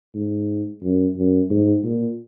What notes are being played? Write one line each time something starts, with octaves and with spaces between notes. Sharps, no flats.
G#2
F#2
F#2
G#2
A#2